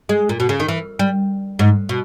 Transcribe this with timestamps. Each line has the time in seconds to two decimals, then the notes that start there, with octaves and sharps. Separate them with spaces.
0.09 G#3
0.29 A#2
0.40 B2
0.49 C#3
0.60 D#3
0.68 E3
0.99 G3
1.59 G#2
1.89 B2